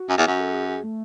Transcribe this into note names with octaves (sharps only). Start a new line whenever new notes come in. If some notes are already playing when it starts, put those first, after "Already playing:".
Already playing: F#4
F#2
E2
F#2
A4
G#4
G#4
A3